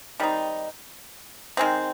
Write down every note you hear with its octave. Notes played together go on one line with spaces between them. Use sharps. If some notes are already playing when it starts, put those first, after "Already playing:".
D#3 G3 C4 D#4
D#3 G#3 C4